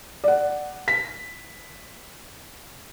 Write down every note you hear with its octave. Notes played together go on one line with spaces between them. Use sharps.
D5 F#5
B6